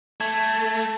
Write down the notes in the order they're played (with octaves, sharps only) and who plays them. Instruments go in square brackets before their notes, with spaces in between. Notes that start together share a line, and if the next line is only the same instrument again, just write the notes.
[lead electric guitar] A3 [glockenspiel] A5 [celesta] G#6